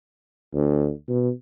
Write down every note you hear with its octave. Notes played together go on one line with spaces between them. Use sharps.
D2
B2